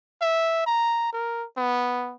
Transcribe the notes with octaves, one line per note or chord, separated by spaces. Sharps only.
E5
A#5
A#4
B3